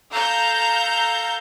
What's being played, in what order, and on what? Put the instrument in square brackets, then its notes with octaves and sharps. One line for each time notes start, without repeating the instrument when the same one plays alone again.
[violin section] A4 F5 A#5 G6